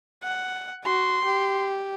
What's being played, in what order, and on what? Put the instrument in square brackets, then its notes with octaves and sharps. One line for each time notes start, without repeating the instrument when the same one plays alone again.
[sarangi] F#5
[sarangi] F#4 [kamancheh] C6
[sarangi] G4